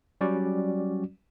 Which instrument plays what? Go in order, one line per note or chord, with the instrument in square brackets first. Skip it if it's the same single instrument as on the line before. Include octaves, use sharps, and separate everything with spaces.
[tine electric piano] F#3 G3 C#4 F#4 D5